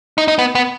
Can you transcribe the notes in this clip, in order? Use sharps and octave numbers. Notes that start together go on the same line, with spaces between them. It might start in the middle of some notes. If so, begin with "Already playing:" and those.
D#4
D#4
B3
B3